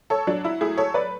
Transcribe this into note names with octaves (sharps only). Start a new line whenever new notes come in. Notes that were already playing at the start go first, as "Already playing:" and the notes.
A4 C#5
F#3 D4
E4
A3 E4 G#4
A4 C#5
B4 D5